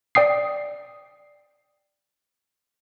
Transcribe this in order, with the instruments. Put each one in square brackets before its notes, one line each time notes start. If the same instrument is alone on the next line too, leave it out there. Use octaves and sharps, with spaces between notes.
[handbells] D5 G5 D#6 C7